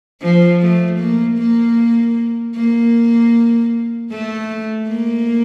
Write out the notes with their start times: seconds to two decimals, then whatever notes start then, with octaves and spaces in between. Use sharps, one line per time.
0.21 F3
0.61 A3
0.99 A#3
1.38 A#3
2.56 A#3
4.10 A3
4.88 A#3